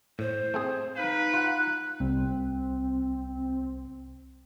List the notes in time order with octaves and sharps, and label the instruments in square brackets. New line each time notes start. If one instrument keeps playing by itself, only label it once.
[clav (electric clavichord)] A2 [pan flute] C5
[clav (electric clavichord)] A3 C4 G#4
[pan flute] D#4 [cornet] B4 [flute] F5
[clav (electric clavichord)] F4 F#5 [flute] F#6
[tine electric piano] C2 [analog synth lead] C4